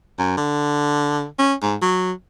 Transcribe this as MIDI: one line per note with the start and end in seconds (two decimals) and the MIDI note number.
0.19 0.37 42
0.37 1.26 50
1.39 1.54 61
1.62 1.76 44
1.82 2.11 54